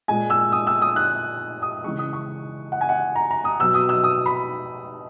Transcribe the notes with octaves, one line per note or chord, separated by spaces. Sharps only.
A#2 G#3 G#5
E6
D#6
E6
D#6
F#6
D#6
C#3 E3 G#3 C#6
D#6
C#6
F#5
G#5
F#5
A#5
A#5
D#6
B2 F#3 E6
D#6
E6
D#6
B5